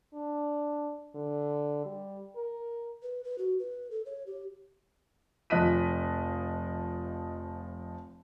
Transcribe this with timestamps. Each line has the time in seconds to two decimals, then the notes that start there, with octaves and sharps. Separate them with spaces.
0.14 D4
1.15 D3
1.85 G3
2.36 A#4
3.02 B4
3.24 B4
3.38 F#4
3.59 B4
3.91 A4
4.06 C#5
4.27 G4
5.50 F1 F3 D#5 F#6 B6 D#7